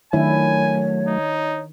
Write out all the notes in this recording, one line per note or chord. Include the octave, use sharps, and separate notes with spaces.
D#3 F#3 A3 D4 E4 C#5 G#5
D#4